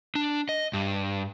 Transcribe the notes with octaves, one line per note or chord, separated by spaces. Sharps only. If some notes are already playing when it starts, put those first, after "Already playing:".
D4
D#5
G2